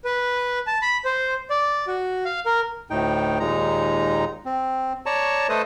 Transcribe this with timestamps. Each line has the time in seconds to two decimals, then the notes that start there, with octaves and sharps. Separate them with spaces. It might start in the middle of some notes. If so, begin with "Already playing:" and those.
0.05 B4
0.67 A5
0.82 B5
1.05 C5
1.50 D5
1.87 F#4
2.25 F5
2.46 A#4
2.90 D2 A2 D#4 G5
3.40 D#2 A#2 G#3 D#4 A#5
4.46 C4
5.06 C#5 D5 A5 A#5 C#6
5.49 A3 A4 B4 C5 D#5 D#6